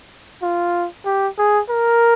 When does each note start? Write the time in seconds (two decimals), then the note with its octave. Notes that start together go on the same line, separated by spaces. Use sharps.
0.42 F4
1.05 G4
1.38 G#4
1.69 A#4